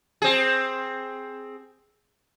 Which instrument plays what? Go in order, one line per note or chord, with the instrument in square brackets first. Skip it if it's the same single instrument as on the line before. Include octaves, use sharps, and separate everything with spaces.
[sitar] C4 G#4